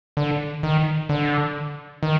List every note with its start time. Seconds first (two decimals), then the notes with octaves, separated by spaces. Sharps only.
0.17 D3
0.63 D#3
1.09 D3
2.03 D#3